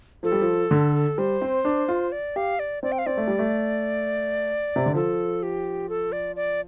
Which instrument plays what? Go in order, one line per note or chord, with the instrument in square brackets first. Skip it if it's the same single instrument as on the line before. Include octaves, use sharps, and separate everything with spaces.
[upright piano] F3 [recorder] A4
[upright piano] G3
F3
D3
[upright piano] G3 [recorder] C5
[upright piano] C4
D4
F4
[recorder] D5
[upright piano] G4 [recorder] F5
[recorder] D5
[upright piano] C4 [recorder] D5
[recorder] G5
F5
[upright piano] C4 [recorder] D5
[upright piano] A3
G3
A3
C3
D3
[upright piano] F3 [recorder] A4
[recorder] G4
A4
D5
D5